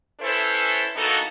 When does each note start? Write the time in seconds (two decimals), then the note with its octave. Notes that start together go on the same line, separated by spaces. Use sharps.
0.20 C#4 E4 A4 B4 C5
0.96 E3 A#3 B3 D#4 F#4 A4